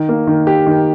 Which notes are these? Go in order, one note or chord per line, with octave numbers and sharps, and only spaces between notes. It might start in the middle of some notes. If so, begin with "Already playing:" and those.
Already playing: D#3
A#3
D#3
G4
D#3